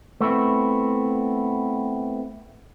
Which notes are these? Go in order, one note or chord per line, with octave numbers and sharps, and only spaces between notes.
A3 B3 C4 E4